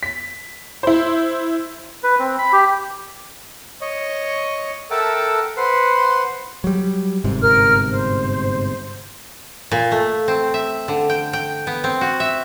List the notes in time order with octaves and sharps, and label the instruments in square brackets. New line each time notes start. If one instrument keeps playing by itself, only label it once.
[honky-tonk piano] B6
E4 C5
[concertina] B4
C4
B5
G4
[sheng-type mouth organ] C#5 D#5
A4 A#4 E5 F#5 G5 A5
B4 C5 F#5 C6
[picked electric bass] F#3 G3
G1 G#2 C3
[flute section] A#4 F6
C5
[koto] A#2
A3
C4
E5
D3
G5
G5
B3
C4
F#4
E5